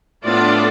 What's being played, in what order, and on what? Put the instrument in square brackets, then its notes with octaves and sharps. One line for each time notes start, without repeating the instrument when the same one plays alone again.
[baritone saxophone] A2 [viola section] B3 D4 F4 A4 D5